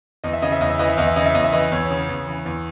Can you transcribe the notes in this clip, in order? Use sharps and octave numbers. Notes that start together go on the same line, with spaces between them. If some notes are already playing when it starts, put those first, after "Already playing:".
E2 D#5
E5
C#3 D#5
E5
E2 D#5
E5
E3 D#5
E5
E2 D#5
E5
C#3 D#5
E5
E2 D#5
E5
E3 D#5
E2 C#5
C#3
E2
E3
E2